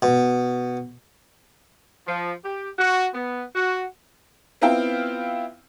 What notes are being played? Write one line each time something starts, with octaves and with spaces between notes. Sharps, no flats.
B2
F3
G4
F#4
B3
F#4
B3 C4 E4 F4 F5 G5